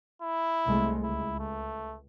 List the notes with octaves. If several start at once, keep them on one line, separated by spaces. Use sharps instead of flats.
E4
C2 G#3 A3
C#2 E4
A3